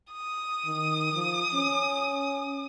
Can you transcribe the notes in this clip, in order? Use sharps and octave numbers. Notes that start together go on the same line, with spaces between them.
D#6
D#3
F3
C#4